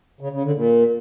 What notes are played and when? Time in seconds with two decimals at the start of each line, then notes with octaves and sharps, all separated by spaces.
0.21 C#3
0.32 C#3
0.44 D3
0.56 A#2